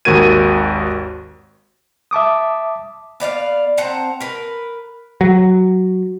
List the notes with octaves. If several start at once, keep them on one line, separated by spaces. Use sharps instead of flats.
G#1 D#2 F#4 A#4 G#6 D#7
E5 A5 D6 D#6
B3 D5 E5 F5
C4 F#5 A5 A#5
A#4 B4
F#3